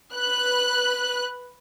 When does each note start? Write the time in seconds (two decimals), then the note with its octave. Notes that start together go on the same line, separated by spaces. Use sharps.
0.14 B4 F#6